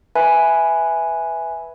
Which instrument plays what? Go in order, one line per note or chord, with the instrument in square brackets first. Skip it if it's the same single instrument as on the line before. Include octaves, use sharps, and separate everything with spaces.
[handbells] B4 E5 G#5 B5